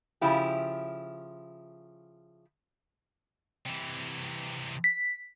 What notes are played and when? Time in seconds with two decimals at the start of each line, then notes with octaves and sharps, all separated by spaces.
0.21 C#3 F3 E4 G4
3.66 C3 E3
4.84 B6